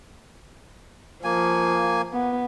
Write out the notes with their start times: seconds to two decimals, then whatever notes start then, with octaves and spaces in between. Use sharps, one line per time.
1.24 F3 A#3 G#5
2.13 B3